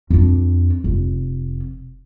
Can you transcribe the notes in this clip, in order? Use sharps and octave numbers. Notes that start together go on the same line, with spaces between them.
F2 D4
F1